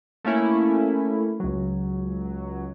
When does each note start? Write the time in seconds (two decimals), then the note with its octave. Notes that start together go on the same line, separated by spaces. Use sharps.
0.24 A3 A#3 C#4 E4
1.40 C#2 F#3